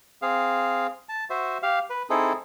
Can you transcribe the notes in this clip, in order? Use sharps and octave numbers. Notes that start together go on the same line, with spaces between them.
C4 G#4 F5
A5
F#4 C5 E5
G4 F5
B4
C4 D#4 E4 G#4 A4